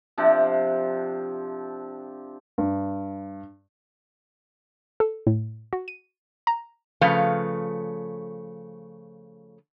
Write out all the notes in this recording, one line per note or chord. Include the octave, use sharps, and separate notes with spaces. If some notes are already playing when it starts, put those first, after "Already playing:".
C3 F3 D4
G2
A4
A2
F#4
D#7
A#5
C#3 F3 A3 B4 F5